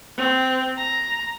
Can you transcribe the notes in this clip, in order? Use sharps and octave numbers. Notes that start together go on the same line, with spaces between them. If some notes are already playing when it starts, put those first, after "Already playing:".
C4
A#5